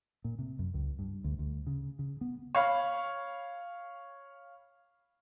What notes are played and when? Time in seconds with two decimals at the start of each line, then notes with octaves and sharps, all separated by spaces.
0.24 A#2
0.39 C3
0.59 F#2
0.74 C#2
0.99 G2
1.24 D2
1.39 D2
1.67 C#3
1.99 C#3
2.21 B3
2.55 C#5 F5 B5